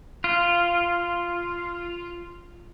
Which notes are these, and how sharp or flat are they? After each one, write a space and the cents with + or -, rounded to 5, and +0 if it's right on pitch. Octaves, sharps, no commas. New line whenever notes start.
F4 -10